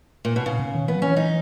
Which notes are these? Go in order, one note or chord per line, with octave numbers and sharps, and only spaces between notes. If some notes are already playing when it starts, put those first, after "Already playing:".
A#2
B2
A#2 C#3
B2
D#3
E3 B3
F#3
E3 C#4
D#4